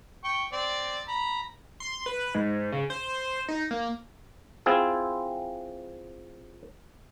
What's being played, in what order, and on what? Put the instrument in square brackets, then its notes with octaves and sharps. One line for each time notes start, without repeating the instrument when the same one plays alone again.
[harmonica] G5 C#6
C4 D5
A#5 B5
[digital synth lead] C6
B4
G#2
C#3
C5
D#4
A#3
[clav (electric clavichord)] C4 E4 F4 G#4